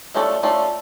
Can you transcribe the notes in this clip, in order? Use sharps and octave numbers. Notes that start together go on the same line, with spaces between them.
A3 C#4 F4 A4 D5
A3 C#4 F4 A4 D5